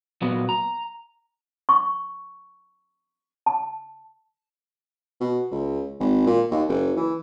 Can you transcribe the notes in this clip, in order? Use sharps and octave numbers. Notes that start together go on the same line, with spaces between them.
A#2 F#3 B3
A#5
C#6
A5
B2
C#2
G#1
A#2
D#2
F#1
E3